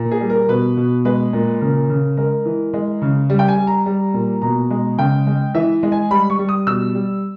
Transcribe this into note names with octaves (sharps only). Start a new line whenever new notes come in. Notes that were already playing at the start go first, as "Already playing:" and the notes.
Already playing: A#2
G#4
G3
A#4
B2 B4
B2
G#3 B4
A#2
C#3 A#4
C#3
G#3 A#4
E3
G#3
C#3
G3
G5
G#5
G3
A#5
G3
A#2
B2 A#5
G#3
C#3 G5
G#3
E3 E5
G#3
G#5
G3 B5
C#6
G3
D#6
B2 E6
G3